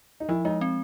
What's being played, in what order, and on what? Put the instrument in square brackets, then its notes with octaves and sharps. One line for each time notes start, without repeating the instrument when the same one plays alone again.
[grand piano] D#4
[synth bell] F3 [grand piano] E4
[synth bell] G#3 [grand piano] D#4
[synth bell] C4